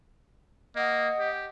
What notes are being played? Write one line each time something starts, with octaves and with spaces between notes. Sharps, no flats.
A#3 D#5 F#5 D#6
G4